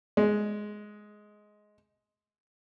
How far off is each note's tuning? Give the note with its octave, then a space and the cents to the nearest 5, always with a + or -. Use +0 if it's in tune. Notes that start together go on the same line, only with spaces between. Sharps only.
G#3 +10